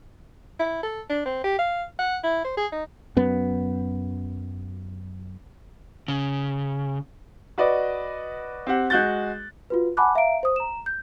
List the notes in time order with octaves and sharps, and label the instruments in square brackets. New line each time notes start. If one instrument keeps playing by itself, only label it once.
[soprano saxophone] E4
A4
D4
C4
G4
F5
F#5
E4
C5
G#4
D#4
[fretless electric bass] F#2 B3
[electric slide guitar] C#3
[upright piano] F#4 B4 D5 D#5
C4 G4 F#5
G#3 F#4 F#6 G6 A6
[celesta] F4 F#4 B4
F#5 G#5 A5 B5 D6 F#6
E5 F5 A#5 D7
C5 D#6
A#5 E7
G6